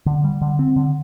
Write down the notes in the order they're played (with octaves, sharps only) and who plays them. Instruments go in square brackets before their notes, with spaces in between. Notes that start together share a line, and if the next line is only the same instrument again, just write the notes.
[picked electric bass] D3
G3
D3
C4
D3